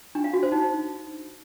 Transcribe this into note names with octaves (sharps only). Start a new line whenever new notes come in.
D4
F5
F#4
C5
D#4